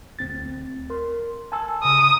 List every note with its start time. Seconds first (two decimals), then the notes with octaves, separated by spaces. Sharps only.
0.19 D2 C4 A6
0.90 A#4 C6
1.52 G#5 A5 E6
1.83 G1 C#3 A#5 D#6